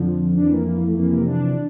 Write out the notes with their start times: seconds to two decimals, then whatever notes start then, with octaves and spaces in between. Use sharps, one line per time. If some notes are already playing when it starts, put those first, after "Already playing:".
Already playing: F2 D3 F3
0.37 F2 E3 D4
0.52 A#3
0.67 A#3
0.77 A#3
0.86 A3
0.96 F2 C3 E3 A#3
1.11 A#3
1.26 D4